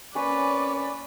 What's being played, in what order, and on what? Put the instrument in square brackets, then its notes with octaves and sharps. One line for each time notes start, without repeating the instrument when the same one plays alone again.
[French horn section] A#3 C4 C#4 [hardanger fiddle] B4 [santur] C#5 G#5 [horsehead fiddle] D5